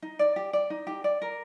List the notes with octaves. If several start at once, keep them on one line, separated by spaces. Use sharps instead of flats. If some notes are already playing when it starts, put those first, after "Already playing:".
D#4
D5
G4
D5
D#4
G4
D5
A#4